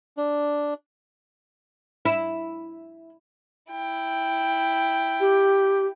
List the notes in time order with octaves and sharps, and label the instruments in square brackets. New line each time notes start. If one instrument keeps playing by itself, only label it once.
[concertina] D4
[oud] E4
[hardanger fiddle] E4 G5
[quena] G4